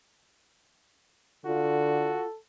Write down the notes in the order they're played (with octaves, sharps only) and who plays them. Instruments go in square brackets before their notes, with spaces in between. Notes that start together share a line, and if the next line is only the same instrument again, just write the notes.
[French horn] D3 [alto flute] F4 [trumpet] F#4 [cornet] A4